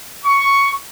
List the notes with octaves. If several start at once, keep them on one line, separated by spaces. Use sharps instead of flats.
C#6